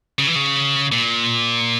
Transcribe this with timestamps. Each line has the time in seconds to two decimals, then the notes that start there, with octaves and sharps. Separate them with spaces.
0.19 C#3
0.27 E3
0.35 C#3
0.92 A#2